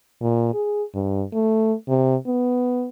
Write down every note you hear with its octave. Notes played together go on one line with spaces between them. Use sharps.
A#2
G#4
G2
A3
C3
B3